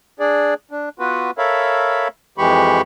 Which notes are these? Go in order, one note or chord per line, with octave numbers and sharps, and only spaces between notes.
D4 G#4 D5
D4
B3 F4 F#4 B4
A4 A#4 C#5 E5 F5 B5
F2 E3 G#3 G4 B5 C#6